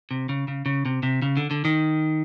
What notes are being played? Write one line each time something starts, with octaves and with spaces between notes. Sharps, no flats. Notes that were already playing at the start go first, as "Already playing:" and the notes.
C3
C#3
C#3
C#3
C3
C3
C#3
D3
D3
D#3